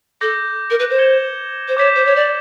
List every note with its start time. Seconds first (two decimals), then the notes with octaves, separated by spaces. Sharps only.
0.21 A4 D6 G6 A#6
0.70 A#4
0.79 B4
0.90 C5
0.98 G#6 C#7 E7 G7
1.68 C5
1.77 C#5 D6 G6 B6 E7
1.95 C5
2.05 C#5
2.15 D5